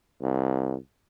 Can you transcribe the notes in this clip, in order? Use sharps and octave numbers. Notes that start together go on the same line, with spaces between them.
C2